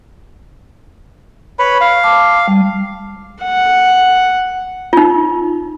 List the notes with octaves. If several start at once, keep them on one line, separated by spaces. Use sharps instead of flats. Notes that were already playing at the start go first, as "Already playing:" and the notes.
B4 C#5 B5
F5
A5 D6
G3
F#5
D#4 F4